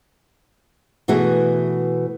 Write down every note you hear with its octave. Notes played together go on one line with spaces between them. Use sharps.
B2 E3 A3 F#4 G#4